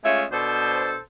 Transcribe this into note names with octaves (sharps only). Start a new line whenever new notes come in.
G#3 A3 C#4 F4 E5
B2 D4 A4 C5